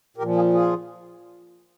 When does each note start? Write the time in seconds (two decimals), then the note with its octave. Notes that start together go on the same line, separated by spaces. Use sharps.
0.17 A#2 G4 A#4
0.22 F3
0.35 F4 G#4
0.53 F4 G#4